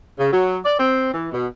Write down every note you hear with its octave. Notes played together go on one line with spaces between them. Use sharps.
C#3
F#3
D5
C4
E3
B2